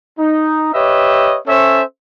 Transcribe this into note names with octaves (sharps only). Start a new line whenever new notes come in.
D#4
G4 B4 C#5 D#5 E5
C#4 A4 C5 C#5 E5